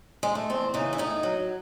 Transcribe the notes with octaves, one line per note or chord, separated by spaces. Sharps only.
G#3
A3
E2 C4
C#3 E3 D#4
E4
A2 D#4
F#3